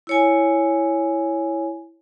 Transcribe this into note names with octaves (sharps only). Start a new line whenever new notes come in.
E4 C#5 G#5